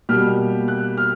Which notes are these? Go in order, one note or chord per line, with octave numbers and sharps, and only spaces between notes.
B2 G3 A#3 F6
F#6
F6